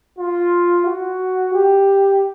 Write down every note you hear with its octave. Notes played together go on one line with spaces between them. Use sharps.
F4
F#4
G4